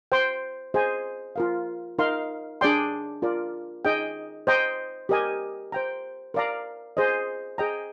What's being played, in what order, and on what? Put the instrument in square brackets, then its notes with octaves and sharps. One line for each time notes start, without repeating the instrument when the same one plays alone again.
[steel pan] C5 G5 C6
G#4 C5 D#5 G#5
F4 A#4 F5
D#4 A#4 F5 C6
D4 G#4 D5 G5 C6
F4 A#4 D5
D#4 G#4 D#5 G5
C5 D#5 G5 A#5
G4 A#4 D#5 G#5
C5 G5 A#5
A#4 D5 F5 A#5
G#4 C5 D#5
G#4 D#5 G5 A#5